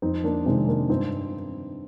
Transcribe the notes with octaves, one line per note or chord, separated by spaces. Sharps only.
F2 C4 D#4
A#3 D4
C3 D#3 G#3 C4
A#3 D4
G2 C4 D#4